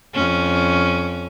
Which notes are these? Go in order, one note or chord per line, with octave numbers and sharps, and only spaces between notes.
F2 C#4